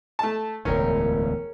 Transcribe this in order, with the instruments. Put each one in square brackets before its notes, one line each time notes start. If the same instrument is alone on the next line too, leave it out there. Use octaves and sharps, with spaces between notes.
[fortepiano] A3 A5
[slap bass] E1 D2 A2 [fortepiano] C#4 [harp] G#4 A#4 G5